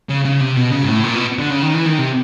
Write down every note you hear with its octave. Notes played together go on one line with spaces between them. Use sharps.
C#3
C#3
C3
B2
C#3
G#2
A2
A#2
B2
D3
C#3
D#3
E3
D#3
C3